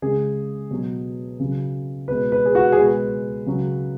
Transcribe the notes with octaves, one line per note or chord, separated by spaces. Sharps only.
C#3 G#3 G#4
B2 F#3
C#3 F#3
B2 G#3 B4
B4
G#4
F#4
G#4
B2 G#3 B4
C#3 F#3